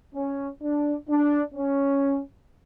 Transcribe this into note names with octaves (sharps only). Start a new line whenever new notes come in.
C#4
D4
D4
C#4